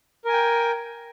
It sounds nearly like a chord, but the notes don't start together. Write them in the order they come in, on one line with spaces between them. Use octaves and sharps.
A#4 G#5 G5